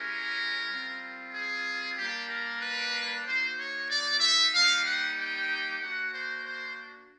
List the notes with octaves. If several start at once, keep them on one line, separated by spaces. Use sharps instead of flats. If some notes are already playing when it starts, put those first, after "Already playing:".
Already playing: G#3 C#4 E4 G4 A#4
G3 C4 F4
G#4
G3 A#3 D4 G4
A#4
B4
A#3 D#4 F#4 C5
C#5
D5
E5
G3 A#3 D#4 G4 F5
F#5
G5
A#3 D4 F#4 F#5
C5
C5